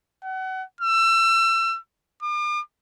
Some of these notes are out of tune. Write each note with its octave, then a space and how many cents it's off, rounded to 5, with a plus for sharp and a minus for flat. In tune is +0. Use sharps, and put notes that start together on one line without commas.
F#5 +30
E6 +30
D6 +45